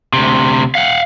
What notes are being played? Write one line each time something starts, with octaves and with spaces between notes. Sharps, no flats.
D2 C3
F5 F#5